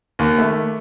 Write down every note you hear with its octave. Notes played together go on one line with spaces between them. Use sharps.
D#2
A3